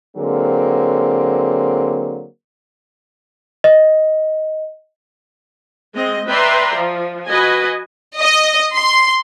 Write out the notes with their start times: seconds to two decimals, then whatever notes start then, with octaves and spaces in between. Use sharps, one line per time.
0.16 D3 F#3 G#3 A#3 C4
3.64 D#5
5.95 G#3 C4 D#5
6.28 B4 D5 E5 G5 A#5 C6
6.74 F3
7.27 F#4 B4 D#5 G#5
8.19 D#5
8.74 C6